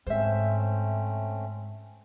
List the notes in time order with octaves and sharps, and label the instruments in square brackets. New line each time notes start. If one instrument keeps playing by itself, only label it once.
[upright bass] G#2 [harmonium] A3 C4 C#4 [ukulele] C5 E5